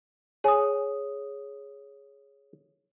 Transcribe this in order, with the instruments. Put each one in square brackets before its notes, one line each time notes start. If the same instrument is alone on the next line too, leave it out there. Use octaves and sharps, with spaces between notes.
[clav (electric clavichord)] G#4 [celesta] C#5 D#6